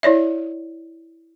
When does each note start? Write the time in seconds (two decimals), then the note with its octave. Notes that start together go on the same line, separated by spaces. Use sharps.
0.03 E4 C#5 D5 E5